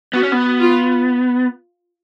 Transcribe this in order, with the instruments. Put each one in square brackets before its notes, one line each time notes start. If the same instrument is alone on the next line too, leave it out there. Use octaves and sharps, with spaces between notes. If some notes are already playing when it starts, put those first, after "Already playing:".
[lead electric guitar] B3 [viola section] F#4
[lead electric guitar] C#4
B3
[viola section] F4